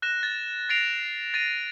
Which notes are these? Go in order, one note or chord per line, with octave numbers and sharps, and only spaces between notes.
F#6 A#6 E7
A6
A6 A#6 C7 D7 F7
A6 A#6 D#7